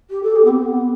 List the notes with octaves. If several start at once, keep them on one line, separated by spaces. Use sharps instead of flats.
G4
A4
G4
B3
C4
B3